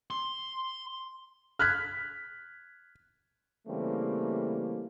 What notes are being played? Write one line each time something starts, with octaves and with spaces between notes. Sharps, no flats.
C6
F6 F#6 G#6 B6
C#3 E3 G3 A3 A#3 C4